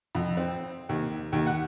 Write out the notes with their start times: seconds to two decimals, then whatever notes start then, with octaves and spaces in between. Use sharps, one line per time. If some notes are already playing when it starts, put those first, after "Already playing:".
0.15 F2
0.37 C4
0.89 D#2
1.32 D#2
1.46 F#5